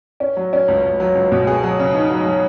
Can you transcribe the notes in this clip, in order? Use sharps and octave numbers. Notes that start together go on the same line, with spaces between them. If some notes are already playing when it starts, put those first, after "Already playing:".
C#4
F#3
C#4
C#2
C#2
F#3
C#2
B2
G#4
F#3
C#3
D#4
F#3
F#3